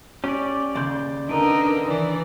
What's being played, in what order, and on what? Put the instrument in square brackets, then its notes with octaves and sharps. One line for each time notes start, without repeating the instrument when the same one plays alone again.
[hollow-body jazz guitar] C#4 [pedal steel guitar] G4 D5
[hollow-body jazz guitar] D#2 C#3 [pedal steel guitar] D5 C6 G6
[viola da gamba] D3 [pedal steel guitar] D4 B4 [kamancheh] D#4 A#4
[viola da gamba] E3 [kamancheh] D5